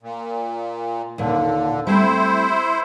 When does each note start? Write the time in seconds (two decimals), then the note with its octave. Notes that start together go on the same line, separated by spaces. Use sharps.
0.03 A#2
1.18 D#2 A#2 D3
1.87 G3 A3 C4 E4 C5